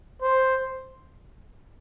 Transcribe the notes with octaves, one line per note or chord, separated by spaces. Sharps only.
C5